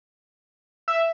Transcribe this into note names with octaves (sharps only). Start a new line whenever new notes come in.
E5